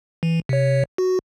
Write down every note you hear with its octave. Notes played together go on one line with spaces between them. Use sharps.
E3
C3 C#5
F#4